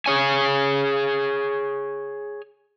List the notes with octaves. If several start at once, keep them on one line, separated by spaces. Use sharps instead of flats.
G#4 C#5 G#5